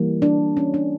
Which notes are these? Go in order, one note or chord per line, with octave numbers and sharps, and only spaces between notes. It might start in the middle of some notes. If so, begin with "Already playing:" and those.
Already playing: E3 G3 A#3
D4
C#4
D4